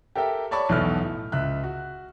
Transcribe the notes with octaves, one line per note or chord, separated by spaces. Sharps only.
G4 A4 A#4 E5 G5
C#5 D5 A5 B5 C#6
B1 E2 B2 E4 A4 F6
A2
C#2 E5 F#6
F#4